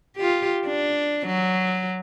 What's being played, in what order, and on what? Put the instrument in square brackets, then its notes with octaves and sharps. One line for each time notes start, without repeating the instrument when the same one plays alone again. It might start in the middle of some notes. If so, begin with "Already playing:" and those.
[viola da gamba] F4 G4
D4
F#3